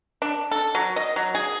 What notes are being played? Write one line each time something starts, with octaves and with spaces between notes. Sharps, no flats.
D4
A4
F#3
D#5
F#3
G#4